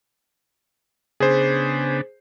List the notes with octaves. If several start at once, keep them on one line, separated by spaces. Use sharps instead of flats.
C#3 B3 D4 G#4 C5